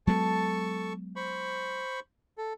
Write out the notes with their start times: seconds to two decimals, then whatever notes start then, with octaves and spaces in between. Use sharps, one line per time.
0.07 F#3 G#3 B3 A4 A5 C#6
1.16 C5 B5 C#6
2.38 A4